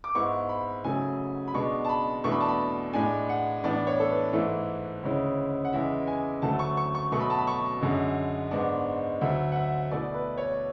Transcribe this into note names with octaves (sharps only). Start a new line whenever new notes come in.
D6
G#2 G#3 B3 E4 C#6
B5
C#3 F#3 A3 G#5
B5
B2 G#3 B3 D4 C#6
A5
B5
E2 B2 A3 D4 C#6
B5
A5
B5
A2 G#3 D4 G#5
F#5
A2 E3 B3 D4 D5
C#5
A4
B4
G#2 E3 A3 E4
D2 C#3 G#3 C#4 E4
F#5
E2 C#3 G#3 B3 E4 E5
G#5
D2 D3 F#3 A3 A5
C#6
C#6
C#6
B2 F#3 A3 C#6
B5
A5
B5
C#6
F#2 D3 G#3
G#2 G#3 B3 D4
D2 D3 F#3 E5
F#5
E5
B2 A3 E4 D5
B4
C#5